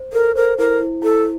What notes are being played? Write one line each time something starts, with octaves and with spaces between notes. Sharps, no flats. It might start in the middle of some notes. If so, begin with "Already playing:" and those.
Already playing: C5
A4 A#4
A#4 C5
E4 A#4
E4
E4 A4